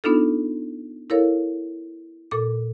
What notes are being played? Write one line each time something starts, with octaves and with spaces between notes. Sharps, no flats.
B3 D4 D#4 F4 A4
E4 A4 A#4 C#5 F5
A#2 A4 D6